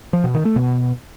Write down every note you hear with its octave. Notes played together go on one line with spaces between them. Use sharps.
F3
B2
D#3
A3
B2